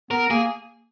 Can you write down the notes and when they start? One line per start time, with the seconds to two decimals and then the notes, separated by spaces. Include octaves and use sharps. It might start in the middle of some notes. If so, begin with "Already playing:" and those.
0.11 B3 A#4
0.30 A#3 G#4